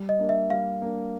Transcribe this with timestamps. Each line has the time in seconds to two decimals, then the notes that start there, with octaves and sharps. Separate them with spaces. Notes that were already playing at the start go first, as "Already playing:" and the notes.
Already playing: G3
0.09 D#5
0.19 A#3 D4
0.29 E5
0.50 G3 F5
0.82 A#3 D4